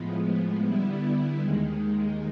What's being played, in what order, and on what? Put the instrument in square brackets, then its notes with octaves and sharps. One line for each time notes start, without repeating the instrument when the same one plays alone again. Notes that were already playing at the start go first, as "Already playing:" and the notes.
Already playing: [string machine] A2 F3 G#3 B3
D3 G3 B3 E4
D#2 D#3 G#3